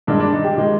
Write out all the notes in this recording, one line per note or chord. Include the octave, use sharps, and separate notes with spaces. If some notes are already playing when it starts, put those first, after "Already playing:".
G2 D#3 G#3 D4
D4
D#4
G4
D#3 G#3 G4